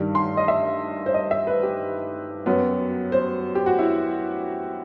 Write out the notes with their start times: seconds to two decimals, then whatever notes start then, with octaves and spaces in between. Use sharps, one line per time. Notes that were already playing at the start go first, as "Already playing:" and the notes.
Already playing: G2 D#3 G3
0.15 C6
0.37 D#5
0.48 E5
1.06 C5
1.14 D#5
1.31 E5
1.47 B4
1.63 G4
2.46 F#2 F#3 B3
3.12 C5
3.55 G4
3.66 F#4
3.79 E4